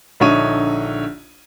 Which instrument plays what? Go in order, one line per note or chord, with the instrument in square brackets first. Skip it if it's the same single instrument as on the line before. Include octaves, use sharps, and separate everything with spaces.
[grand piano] A#1 D3 D#4 C#5 E5 D#7